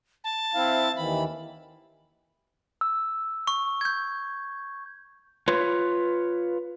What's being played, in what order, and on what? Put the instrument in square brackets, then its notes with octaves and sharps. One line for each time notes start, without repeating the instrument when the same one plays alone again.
[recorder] A5
[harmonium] C4 E4 F5
[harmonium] D#2 D#3 E3 [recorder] B5
[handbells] E6
[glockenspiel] C#6
G6 G#6
[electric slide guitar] F4 B4 C#5